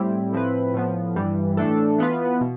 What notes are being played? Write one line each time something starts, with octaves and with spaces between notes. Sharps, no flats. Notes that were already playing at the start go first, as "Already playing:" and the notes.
Already playing: A2 G3 C4 E4 G4
A2 F3 C4 E4 B4
A2 F3 B3
G2 E3 G3
A2 E3 A3 D4 A4
E3 B3 F4 B4
B2